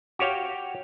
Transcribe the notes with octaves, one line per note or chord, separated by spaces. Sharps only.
F#4 G4 C#5 F5 G5